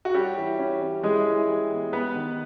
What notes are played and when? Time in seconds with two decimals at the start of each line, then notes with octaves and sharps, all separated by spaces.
0.05 F#4
0.14 G3 C#4 G4
0.37 E3
0.59 C#4
0.82 C#4
1.04 E3 G#3 G#4
1.26 E3
1.48 G3
1.71 B3
1.93 B3 B4
2.15 D#3